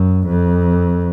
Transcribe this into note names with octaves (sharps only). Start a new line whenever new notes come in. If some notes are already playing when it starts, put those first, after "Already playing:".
Already playing: F#2
F2